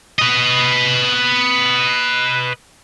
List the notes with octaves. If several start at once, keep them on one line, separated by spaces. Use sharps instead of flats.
B4 D#5